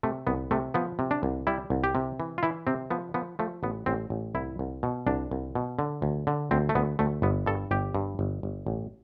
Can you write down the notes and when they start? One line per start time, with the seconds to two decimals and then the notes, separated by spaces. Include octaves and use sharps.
0.03 C3 A3
0.27 C2 B3
0.51 C3 A3
0.74 F3 B3
0.99 C3
1.11 D4
1.23 C2
1.47 G3 E4
1.70 C2
1.84 G4
1.95 C3
2.20 E3
2.38 F4
2.43 E3 E4
2.67 C3 C4
2.90 F3 B3
3.14 F3 B3
3.39 F3 A3
3.63 A1 B3
3.86 A1 C4
4.10 A1
4.35 C2 E4
4.59 C2
4.83 B2
5.06 C2 D4
5.31 C2
5.55 B2
5.79 D3
6.02 D2
6.27 D3
6.51 D2 C4
6.69 A3
6.75 D2 B3
6.99 D2 A3
7.22 G1 B3
7.46 G2 A4
7.71 G1 G4
7.95 G2
8.19 G1
8.43 G1
8.67 A1